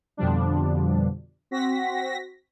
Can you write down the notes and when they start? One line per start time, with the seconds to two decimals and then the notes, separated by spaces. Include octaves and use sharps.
0.17 F2 B2 D3 F3 G3 D4
1.51 C4 F#4 A#6 B6